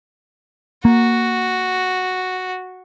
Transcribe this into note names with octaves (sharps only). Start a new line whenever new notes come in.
A#3 F#4